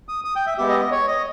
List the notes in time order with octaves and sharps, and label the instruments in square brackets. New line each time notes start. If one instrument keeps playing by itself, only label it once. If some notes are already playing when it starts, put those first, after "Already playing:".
[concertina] D#6
D#6
G5
E5
G#3 B3 G4 E5
D#5
D#5
C#5
D#5